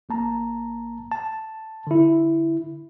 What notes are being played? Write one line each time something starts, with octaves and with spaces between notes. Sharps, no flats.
A1 A#3 A5 A#5
A5
D3 E4